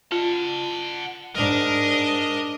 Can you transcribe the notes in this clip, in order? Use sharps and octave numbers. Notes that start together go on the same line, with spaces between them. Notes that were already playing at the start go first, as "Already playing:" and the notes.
F4 F#5 A5
G#2 D4 A#4 D#5